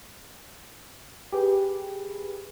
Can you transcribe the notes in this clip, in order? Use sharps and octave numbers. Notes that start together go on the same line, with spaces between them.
G4 G#4 B4